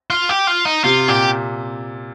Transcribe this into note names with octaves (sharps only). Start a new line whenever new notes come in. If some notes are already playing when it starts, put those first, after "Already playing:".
F4
G4
F4
D#4
C3 F4
A#2 G4